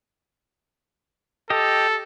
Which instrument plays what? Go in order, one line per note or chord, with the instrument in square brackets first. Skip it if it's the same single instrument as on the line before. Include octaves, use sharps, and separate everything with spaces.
[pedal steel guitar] G4 D#5 [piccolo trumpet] A4